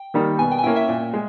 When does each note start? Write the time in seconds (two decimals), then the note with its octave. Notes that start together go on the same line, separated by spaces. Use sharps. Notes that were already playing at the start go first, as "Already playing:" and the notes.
Already playing: G5
0.14 D#3 G3 A#3 D#4
0.39 B2 G#5
0.51 G5
0.58 G#5
0.63 A#3 C#4 E4 G5
0.76 E5
0.89 A#2
1.14 G#3